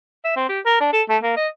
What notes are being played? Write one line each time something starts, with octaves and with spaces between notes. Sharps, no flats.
E5
C4
G4
A#4
D4
A4
A3
A#3
D#5